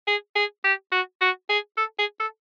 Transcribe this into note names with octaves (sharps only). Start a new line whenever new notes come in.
G#4
G#4
G4
F#4
F#4
G#4
A4
G#4
A4